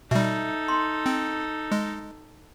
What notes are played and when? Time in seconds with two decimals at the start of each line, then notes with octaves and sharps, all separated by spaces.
0.11 B2 G3 D#4 A4 E5
0.68 C6
1.06 C4
1.72 G#3